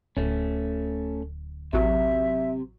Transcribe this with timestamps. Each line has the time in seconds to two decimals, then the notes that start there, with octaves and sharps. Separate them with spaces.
0.17 D1 A3 C#4
1.73 A1 C3 F#3 E5